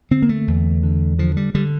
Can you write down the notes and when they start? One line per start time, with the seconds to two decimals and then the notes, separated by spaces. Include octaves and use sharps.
0.11 D3 C4
0.22 A#3
0.29 A3
0.48 E2
0.83 D3
1.19 D3 F3
1.37 G3
1.55 D3 G3